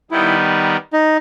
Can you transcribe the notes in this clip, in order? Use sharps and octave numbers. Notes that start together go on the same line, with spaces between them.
D#3 G3 B3 D#4 E4
D#4